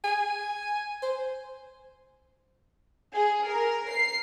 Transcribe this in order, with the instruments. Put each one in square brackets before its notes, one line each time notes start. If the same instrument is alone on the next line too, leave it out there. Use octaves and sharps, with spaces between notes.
[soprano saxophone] G#5
C5
[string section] G#4
A#4
C7